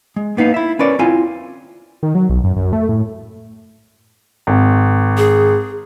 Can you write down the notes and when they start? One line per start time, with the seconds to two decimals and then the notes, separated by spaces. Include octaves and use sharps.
0.16 G#3
0.37 A#3 B3 D#4 F5
0.54 E4 E5
0.79 C#4 A#4 B4 C#5 D5
0.99 C4 E4 F4 G#5
2.03 D#3
2.15 F#3
2.30 B1
2.44 F#2
2.56 F#2
2.73 A3
2.89 A2
4.47 G#1
5.18 G#4